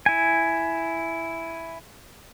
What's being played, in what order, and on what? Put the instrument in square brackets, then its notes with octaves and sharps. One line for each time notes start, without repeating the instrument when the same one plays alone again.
[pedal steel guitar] E4 G#5